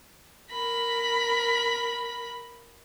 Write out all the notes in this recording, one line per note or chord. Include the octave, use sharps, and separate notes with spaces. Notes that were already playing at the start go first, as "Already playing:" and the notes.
A#4 B5